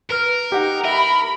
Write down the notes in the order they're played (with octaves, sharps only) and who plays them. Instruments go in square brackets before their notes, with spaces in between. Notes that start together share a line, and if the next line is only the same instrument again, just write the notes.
[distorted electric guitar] A#4 [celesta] B4 F6
[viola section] D#4 [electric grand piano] G4 F#5
[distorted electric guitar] A#4 [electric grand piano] E5 [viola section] B5